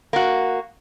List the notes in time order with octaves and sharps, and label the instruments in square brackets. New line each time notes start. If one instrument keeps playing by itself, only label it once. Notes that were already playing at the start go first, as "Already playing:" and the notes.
[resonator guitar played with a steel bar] A#3 F#4